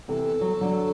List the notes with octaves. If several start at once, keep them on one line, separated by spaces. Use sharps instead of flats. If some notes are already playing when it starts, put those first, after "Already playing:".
C3 E3 A4
F#3
D3 F#3